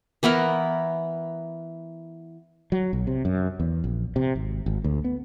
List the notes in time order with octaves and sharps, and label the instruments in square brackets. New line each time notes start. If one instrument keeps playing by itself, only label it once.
[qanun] E3 B3 E4 A#4
[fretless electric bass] F#3
B1
C3
F#2
E2
A#1
C3
G#1
G#1
D2
B3